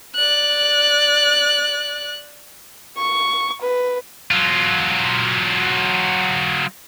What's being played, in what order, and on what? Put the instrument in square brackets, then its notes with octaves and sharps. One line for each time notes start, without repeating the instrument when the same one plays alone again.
[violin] D5 F#6
[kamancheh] C#6
B4
[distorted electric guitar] F#3 F4